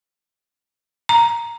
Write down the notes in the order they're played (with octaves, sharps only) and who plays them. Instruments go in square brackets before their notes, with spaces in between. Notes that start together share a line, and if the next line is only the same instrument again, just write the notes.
[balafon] A#5